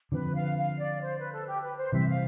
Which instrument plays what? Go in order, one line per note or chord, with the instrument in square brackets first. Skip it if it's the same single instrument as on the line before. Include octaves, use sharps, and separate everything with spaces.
[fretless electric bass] D3 F3 C4 [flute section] B4
[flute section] F5
F5
D5
C5
B4
A4
G4
B4
C5
[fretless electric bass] C3 E3 G3 C4 [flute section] E5
[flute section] F5